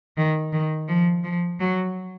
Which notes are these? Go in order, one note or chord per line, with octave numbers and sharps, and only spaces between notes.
D#3
D#3
F3
F3
F#3